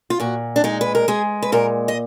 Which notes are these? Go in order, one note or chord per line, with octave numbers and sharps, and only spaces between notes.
F4
A#2 F#4
D4
G#3 D#4
B4
A#4
G#3 G#4
B4
A#2 A#4
D#5